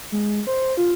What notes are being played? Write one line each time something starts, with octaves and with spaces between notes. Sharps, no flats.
G#3
C5
F4